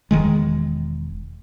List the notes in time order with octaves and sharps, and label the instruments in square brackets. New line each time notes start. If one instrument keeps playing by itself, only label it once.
[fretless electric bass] E1 D#3 G#3